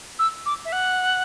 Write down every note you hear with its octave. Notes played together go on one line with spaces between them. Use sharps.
E6
D6
E5
F#5